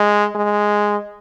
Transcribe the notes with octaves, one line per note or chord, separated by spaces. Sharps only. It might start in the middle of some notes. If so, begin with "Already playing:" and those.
Already playing: G#3
G#3